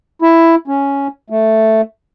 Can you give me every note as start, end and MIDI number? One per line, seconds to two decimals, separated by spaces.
0.22 0.55 64
0.68 1.07 61
1.30 1.81 57